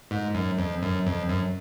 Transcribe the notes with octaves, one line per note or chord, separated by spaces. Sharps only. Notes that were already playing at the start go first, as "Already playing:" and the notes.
G#2
F#2
F2
F#2
F2
F#2